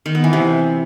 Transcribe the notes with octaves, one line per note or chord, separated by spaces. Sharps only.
D#3
B3
E3
C3